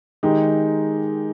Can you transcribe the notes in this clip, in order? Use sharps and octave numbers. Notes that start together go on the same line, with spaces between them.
D#3 G#3 D#4 G4